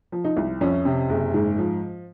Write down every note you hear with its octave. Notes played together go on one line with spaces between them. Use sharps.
F3
D#4
C2
F2 C#4
C3
F#1
G#2
F3